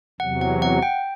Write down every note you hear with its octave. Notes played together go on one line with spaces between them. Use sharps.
E2 C3 F#3 F#5
F#5
F#5
G5